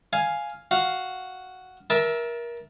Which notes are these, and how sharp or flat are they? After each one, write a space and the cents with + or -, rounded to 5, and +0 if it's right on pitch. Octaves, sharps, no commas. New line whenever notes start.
F5 +0 G#5 +5
F#4 +0 F5 +0
A#4 +25 E5 +0 A5 -10